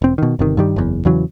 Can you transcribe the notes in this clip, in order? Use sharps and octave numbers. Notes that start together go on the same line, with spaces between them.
E1 C4
B2 D#3
G1 C3 D#3
G2 D#3 G3
F#1 E2
E2 C#3 E3 F#3